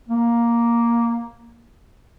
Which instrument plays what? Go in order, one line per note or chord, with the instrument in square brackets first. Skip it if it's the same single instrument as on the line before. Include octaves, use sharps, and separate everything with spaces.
[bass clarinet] A#3